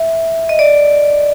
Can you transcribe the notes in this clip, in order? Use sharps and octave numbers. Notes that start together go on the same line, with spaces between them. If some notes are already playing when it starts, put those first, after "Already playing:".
Already playing: E5
D#5
D5